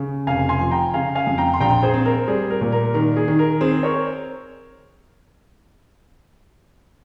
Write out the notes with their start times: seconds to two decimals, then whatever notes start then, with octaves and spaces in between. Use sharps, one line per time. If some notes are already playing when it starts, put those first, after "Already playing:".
Already playing: C#3
0.27 F1 F5 G#5
0.49 G#5 C6
0.61 F3
0.71 G5 A#5
0.94 C#3 F5 G#5
1.15 F5 G#5
1.27 F2
1.38 G5 A#5
1.54 C6
1.60 A#1 G5 A#5
1.83 G#4 C5
1.94 C4
2.05 A#4
2.28 G3 G#4
2.50 A#4
2.61 A#2
2.72 A#4
2.94 D#3 A#4
3.17 G#4
3.28 D#3
3.39 A#4
3.61 C4 G#4 C5
3.83 A#4 C#5